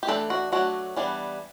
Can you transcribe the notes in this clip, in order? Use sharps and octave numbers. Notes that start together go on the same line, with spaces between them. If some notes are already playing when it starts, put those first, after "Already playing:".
G4
E3 A3 D4 A4
F#4
F#3 A3 D4 F#4
E3 G3 B3 D4